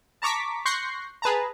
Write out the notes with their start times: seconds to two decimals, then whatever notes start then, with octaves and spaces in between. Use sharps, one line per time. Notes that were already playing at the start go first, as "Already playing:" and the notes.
0.22 A5 A#5 C#6 D6 B6
0.65 C6 C#6 F#6 G6 A#6 C7
1.22 G#4 B4 A5 A#5